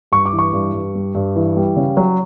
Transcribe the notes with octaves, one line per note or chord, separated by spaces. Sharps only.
G2 C#6
D6
E3
C#6
G2
G2
G3
G2
E3
G3
C#3
F#3